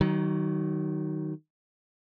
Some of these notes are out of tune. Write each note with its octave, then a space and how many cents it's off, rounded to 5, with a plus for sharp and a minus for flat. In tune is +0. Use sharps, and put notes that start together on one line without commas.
D#3 +0 F#3 +30